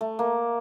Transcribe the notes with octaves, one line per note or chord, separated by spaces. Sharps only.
A3
A#3